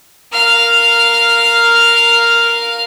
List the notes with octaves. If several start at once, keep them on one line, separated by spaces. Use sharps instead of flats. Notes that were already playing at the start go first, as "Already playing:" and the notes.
A#4 F5